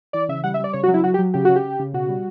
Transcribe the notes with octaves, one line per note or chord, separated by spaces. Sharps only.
E3 D5
C#3 E5
G3 F#5
E5
G3 D5
C#3 C#5
F#4
F#3
E4
F#3 F#4
G4
F#3
C#3 G4
C#3 F#4
G4
C#3
C#3
B2 F#4
G3